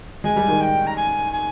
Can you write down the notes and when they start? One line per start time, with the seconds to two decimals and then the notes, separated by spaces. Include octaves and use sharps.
0.24 G#3 G#5
0.36 G3
0.48 D#3
0.61 G5
0.87 A#5
0.96 G#5
1.32 G#5